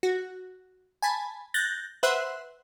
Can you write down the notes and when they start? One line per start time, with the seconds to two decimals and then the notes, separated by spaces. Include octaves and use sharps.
0.03 F#4
1.02 G#5 A5 B5
1.54 F#6 G6 A6 A#6
2.03 B4 C5 E5 F#5 C6 F#6